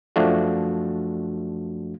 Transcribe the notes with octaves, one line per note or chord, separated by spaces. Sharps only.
F#2 F3 A3 D4 F#4